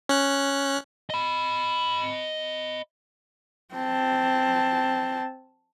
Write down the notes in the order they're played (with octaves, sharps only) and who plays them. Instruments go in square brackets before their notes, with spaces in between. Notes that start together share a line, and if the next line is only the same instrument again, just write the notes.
[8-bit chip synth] C#4 F#6
[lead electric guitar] D#5 B5
[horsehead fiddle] C4 A5